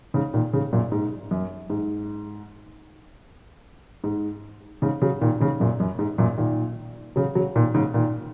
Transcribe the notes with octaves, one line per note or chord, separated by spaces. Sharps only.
G#2 C#3
A#2 D#3
G#2 C#3
F#2 A#2
G#2
F#2
G#2
G#2
G#2 C#3
C#3 F#3
A#2 D#3
G#2 C#3
F#2 A#2
F#2
G#2
F#2 A#2
A#2 D#3
C#3 F#3
C#3 F#3
A#2 D#3
G#2 C#3
A#2 D#3